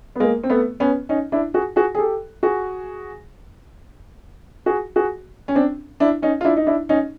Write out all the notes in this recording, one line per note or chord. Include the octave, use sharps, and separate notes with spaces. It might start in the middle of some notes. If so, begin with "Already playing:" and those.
B3
G#3 A#3
C4
A3 B3
B3 C#4
C#4 D#4
D4 E4
F#4 G#4
F#4 G#4
G#4
G4 A4
F#4 G#4
F#4 G#4
F#4 G#4
C#4
C4 D4
D4 E4
C#4 D#4
F4
D4 E4
D#4
D4 E4
C#4 D#4